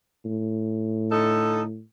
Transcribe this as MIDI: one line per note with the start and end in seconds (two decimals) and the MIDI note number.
0.25 1.81 45
1.11 1.62 50
1.11 1.62 63
1.11 1.62 69